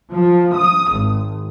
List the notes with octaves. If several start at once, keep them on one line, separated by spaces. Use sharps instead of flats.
F3
D#6
G#1